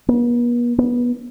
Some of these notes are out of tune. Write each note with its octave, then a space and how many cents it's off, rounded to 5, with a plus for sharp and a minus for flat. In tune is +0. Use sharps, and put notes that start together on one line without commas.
B3 -45
B3 -20